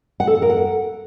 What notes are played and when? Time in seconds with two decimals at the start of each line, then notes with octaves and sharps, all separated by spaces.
0.20 F#5
0.27 A4
0.35 F#5
0.42 A#4
0.50 F#5